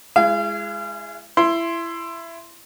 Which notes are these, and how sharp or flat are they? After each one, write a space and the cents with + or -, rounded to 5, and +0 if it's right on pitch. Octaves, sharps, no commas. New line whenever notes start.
G#3 -5 E4 +30 F5 -35
E4 +20 C6 +0